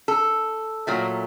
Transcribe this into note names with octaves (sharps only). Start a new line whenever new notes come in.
A4
A#2 F#3 A3